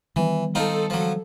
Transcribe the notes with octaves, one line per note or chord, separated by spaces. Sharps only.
D#3 E3 G3 B3
C4 D#4 F4 A4
F3 F#3